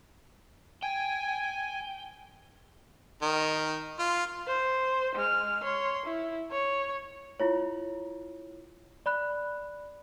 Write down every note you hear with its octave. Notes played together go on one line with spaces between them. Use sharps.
G5 G#5
D#3
F4
C5
G#3 F6
C#5 C6
E4
C#5
E4 F4 C#5
D5 B5 F#6